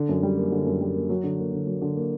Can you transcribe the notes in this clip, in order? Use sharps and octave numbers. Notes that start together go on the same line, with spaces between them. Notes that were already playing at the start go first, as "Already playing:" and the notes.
Already playing: D3
F#2
G3
A#3
D3
F#2
G3
A#3
F#3
D3
A#3
D3
F#3
D3
A#3